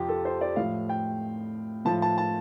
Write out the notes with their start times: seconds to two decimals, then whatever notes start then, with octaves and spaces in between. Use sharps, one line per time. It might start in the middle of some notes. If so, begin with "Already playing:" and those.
Already playing: F2 C3 F3 F4 G4
0.09 A4
0.25 C5
0.41 D5
0.56 A2 F3 F5
0.89 G5
1.85 A2 F3 A5
2.02 A5
2.18 A5